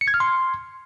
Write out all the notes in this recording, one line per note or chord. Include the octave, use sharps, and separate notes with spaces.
C#7
G#6
F6
C6